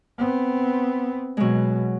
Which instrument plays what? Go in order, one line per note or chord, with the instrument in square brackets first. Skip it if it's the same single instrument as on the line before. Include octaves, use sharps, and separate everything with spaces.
[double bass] B3 C4
[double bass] B2 [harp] F#3 G#3